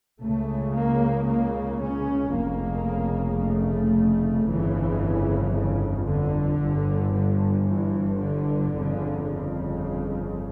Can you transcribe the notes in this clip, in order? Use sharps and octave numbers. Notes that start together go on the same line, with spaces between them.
C#2 C#3 A3
A#3
A#3
C#4
F1 F2 C#3 A#3
A3
G1 F2 C#3 E3
C#3
D3
G1 G2
D3
E3
D3
G1 F2 C#3
C#3